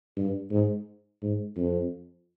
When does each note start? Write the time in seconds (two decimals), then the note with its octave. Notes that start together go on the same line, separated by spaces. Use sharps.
0.17 G2
0.51 G#2
1.22 G#2
1.57 F2